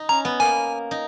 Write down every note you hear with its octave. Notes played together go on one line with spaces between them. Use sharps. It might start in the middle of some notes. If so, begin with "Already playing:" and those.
Already playing: D#4
C#4 A#5
B3
A#3 G#5
D#4